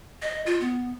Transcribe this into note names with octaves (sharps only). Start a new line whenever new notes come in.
D#5
F4
B3